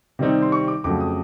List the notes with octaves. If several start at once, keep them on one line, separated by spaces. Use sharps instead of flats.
C3 D#3 G3 C4 D#4
C6
C#6
D6
F2 C#3 F#3 A3 D6
D#6